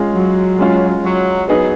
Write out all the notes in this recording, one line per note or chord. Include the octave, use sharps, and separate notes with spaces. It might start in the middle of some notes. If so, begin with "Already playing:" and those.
Already playing: G#3 C#4 F4 G#4
F#3
G#3 C#4 F4
F#3
F#3 B3 D#4 G#4